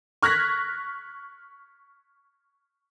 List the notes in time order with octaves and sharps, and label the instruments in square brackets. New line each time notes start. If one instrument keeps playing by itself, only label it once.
[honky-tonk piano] C#6 F6 F#6 G#6 A#6 B6